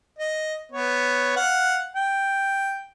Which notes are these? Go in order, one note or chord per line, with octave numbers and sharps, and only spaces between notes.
D#5
B3 C#5
F5 F#5
G5